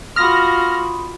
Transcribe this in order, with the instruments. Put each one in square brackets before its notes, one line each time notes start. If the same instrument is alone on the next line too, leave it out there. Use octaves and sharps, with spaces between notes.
[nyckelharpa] F4 F#4 [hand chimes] B5 C6 D#6 [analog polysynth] F6 A#6